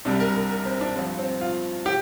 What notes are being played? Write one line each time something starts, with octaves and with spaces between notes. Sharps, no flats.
C2 C3 G3 D4
A#4
A#4
A#4
C4
D4
G2 F3 C4
C4
F4
G4